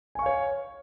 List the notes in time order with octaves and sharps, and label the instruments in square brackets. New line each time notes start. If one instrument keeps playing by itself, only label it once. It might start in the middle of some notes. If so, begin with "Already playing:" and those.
[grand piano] G#5
C#6
F5
C#5